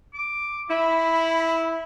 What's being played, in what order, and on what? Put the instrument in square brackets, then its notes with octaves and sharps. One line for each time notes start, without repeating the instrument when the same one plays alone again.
[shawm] D6
[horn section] E4 [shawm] B5